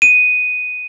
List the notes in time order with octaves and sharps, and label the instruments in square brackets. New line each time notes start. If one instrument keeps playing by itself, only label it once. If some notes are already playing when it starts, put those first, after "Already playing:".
[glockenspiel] D#7